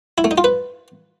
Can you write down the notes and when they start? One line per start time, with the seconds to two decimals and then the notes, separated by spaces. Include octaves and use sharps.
0.18 E4
0.24 A3
0.31 D#4
0.38 F4
0.44 B4